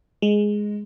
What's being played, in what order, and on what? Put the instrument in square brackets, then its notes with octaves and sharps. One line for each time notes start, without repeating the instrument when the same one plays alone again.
[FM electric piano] G#3